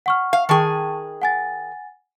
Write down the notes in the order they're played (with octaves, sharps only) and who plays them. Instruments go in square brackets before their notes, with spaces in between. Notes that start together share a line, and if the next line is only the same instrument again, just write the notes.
[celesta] F#5 C#6 F6
[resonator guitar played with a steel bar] F5
[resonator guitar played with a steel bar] D#3 G#4 [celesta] G5 A5 C#6
[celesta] F#5 G#5 A6